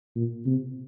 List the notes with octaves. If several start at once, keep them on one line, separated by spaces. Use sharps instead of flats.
A#2
C3